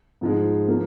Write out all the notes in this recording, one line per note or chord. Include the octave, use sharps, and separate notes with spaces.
G#2 F3 G#3
F3 A#3